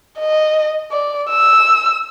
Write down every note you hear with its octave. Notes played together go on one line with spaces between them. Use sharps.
D#5
D5
E6